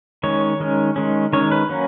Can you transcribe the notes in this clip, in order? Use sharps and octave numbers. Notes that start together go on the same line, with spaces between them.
D#3 G#3 C#4 C#5
D#3 G#3 C#4
D#3 G#3 C#4
D#3 G#3 C#4 C#5
B4
F#3 A#3 C#4